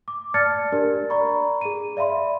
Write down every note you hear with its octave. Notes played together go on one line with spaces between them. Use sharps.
D6
D5 A5 F6 G#6 A6 C#7
D4 G4 A#4 D5
D5 A#5 B5 C#6
G#4 D#7
D5 E5 F5 B5 C6